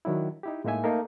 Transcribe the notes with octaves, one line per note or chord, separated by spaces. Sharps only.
D#3 F#3 D4 E4
D#4 E4 G4
A2 G#3 A#3 D#4 E5 G#5
A3 A#3 D#4 A4 A#4